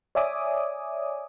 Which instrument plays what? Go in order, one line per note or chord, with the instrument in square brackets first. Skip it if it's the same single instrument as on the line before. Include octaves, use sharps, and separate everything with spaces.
[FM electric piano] C#5 D5 E5 G#5 D6 D#6